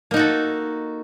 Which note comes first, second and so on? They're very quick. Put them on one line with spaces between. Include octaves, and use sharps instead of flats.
A#3 D#4 F#4 A4